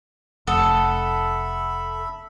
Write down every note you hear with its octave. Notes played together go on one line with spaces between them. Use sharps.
F1 A4 E5 F#5 B5 D#6 E6